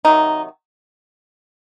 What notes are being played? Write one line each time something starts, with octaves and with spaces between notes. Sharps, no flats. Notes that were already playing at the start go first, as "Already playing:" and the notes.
C3 D#3 F#3 D#4